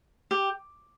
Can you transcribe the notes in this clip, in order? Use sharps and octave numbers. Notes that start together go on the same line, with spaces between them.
G4